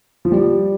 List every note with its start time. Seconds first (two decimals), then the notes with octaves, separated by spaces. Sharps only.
0.25 F3
0.32 G3